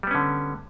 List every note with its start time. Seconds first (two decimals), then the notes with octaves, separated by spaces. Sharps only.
0.03 G3
0.07 B3
0.11 C#4
0.15 D3